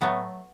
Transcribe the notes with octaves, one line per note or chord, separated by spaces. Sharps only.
A2 F#3 A3 B3